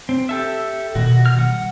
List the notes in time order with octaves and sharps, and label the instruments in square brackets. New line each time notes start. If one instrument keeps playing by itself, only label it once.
[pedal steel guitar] C4
G4 A4 E5
[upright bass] B2 D#3 [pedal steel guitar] F#4
[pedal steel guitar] F6
[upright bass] G3 [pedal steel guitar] F#5